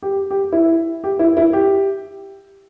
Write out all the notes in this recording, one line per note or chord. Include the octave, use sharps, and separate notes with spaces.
G4
G4
E4
G4
E4
E4
G4